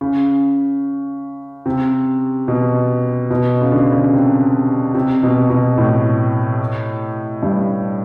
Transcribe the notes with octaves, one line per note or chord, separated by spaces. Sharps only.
C#3
C3
B2
B2
C#3
D3
C#3
C3
C3
B2
B2
A2
G2